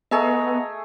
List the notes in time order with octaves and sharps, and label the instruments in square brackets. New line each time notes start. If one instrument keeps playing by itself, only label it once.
[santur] A3 G#4 E5 [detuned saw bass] B3 [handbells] D#5 A#5